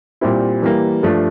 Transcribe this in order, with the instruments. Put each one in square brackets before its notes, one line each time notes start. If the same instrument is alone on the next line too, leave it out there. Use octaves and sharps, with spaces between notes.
[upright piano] A#2 G3 C4 E4
E3 G3 A#3
G2 F3 A3 D4